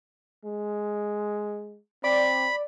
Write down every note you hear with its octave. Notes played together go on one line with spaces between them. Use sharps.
G#3
C4 D5 B5